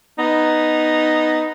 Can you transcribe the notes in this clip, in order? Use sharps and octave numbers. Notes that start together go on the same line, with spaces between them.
B3 D#4